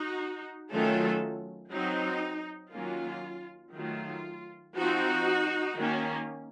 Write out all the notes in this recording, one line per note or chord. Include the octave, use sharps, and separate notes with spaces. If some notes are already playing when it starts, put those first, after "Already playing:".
Already playing: D#4 F#4
D#3 F#3 A3 C#4 F4 A4
F#3 C4 D#4
D#3 F#3 A#3 C#4 F4
D#3 F#3 A3 F4
F3 C4 D#4 F#4
D#3 A#3 C#4